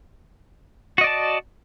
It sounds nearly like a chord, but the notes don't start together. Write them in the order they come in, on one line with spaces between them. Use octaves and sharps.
F#4 D#5 D5 A5